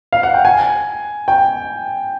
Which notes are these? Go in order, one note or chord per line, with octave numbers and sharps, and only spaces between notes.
F5
F#5
G5
G#5
G5